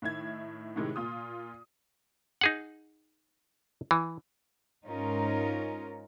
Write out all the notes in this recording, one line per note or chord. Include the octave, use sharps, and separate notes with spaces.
A2 D#3 E5 G#6
A2 C3 D#3 G#3 E4
A#2 F4 D#6
D#4 G#4 F#5
E3
G#2 C#4 D#4 F4 A#4